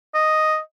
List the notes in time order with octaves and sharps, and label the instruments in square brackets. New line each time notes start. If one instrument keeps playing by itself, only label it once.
[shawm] D#5